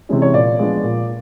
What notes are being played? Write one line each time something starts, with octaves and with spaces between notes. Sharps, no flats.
C3 E3 G#3 C#4
C#5
A#2 D5
F3 G#3 B3 D4
A#2